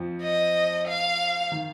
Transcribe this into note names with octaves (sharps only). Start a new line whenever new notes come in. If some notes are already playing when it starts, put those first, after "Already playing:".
Already playing: F2 F3
D#5
F5
D#3